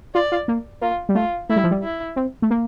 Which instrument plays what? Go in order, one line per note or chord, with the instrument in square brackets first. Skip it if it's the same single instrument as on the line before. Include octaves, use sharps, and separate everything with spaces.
[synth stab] F4 [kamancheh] D5
[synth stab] F4
A#3
[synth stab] A#3 [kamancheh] F4
[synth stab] G3
[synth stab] A3 [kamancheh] F4
[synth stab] A3 [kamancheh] E4
[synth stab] G3
F3
G3
[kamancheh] E4
[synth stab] C4
A3
A#3